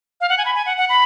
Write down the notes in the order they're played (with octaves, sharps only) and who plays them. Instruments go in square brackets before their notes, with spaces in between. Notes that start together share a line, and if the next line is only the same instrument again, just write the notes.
[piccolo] F5
F#5
G#5
B5
G#5
F#5
F#5
B5